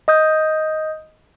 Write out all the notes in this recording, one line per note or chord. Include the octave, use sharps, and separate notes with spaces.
D#5 D#6 G6